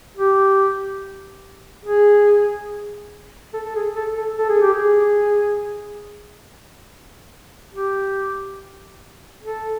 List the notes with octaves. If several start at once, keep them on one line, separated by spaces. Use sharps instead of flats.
G4
G#4
A4
A4
G#4
A4
A4
A4
G#4
G4
G#4
G4
A4